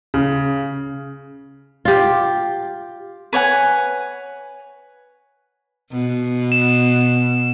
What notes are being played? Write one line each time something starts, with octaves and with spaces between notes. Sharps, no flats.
C#3
F4 G4
B4 C#5 F#5 G#5
B2
E7